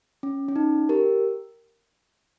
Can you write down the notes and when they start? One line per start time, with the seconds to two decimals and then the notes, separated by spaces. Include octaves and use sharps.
0.23 C#4
0.48 C#4
0.56 D#4
0.89 G4 A#4